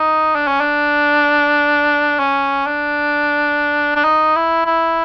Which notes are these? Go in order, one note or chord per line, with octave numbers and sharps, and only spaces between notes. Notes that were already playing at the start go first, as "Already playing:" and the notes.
Already playing: D#4
D4
C#4
D4
C#4
D4
D4
D#4
E4
E4